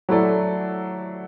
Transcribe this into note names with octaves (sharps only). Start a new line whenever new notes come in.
F#3 A3 E4 A4 D5